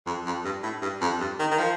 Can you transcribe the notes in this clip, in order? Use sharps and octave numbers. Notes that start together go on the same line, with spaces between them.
F2
F2
G2
A2
G2
F2
G2
D#3
D#3
F3